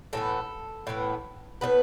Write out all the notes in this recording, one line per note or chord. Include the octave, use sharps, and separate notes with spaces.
A2 E3 B3 A4
A2 E3 B3
A2 E3 B3 B4